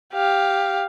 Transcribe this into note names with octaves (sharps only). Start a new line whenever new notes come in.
G4 F5